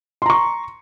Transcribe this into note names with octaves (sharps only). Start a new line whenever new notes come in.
A#5 C6 C#6